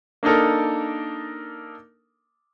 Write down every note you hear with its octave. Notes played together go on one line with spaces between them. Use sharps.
A#3 D4 D#4 A4 A#4